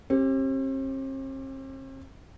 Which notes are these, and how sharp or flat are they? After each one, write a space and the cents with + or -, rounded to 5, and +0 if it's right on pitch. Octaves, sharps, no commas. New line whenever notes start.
C4 +45 G4 +0